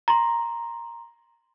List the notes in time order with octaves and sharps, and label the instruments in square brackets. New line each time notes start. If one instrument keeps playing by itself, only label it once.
[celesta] A#5 C6